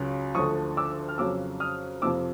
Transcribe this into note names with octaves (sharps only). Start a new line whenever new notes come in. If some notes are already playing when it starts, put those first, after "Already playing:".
Already playing: C#2 C#3 F#3
D2 D3 F3 C#6 D#6
D6 E6
F6
F2 C#3 F#3 D6 E6
D#6 F6
F2 C3 F3 D6 E6